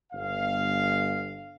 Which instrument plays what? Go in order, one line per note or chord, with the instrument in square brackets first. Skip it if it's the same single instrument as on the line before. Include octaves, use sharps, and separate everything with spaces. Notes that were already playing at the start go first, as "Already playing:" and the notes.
[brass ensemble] G1 F5